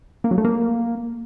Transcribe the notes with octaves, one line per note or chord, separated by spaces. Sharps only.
A#3
F#3
A3
A#3